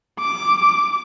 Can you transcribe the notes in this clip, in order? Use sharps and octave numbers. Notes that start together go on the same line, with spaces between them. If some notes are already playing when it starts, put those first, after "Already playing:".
D6